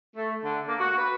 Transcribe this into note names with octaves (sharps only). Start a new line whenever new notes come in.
A3
D3
A#3
F#4
B4